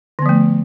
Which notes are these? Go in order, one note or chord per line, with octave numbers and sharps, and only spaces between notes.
D3 F3 A3 B3